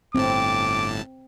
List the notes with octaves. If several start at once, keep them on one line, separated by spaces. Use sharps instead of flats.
G1 A2 C4 A5 D6